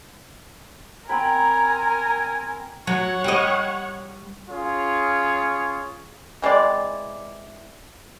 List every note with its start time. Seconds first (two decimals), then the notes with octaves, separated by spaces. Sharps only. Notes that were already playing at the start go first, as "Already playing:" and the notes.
1.09 C4 A#4 G5 G#5 A#5 B5
2.87 F#3 C#5 F#5
3.24 G3 D#5
4.49 C#4 F4 G#4 C#5
6.42 E3 G#3 C4 D5